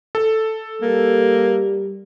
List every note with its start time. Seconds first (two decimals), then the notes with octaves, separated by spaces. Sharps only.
0.15 A4
0.82 G3 A#3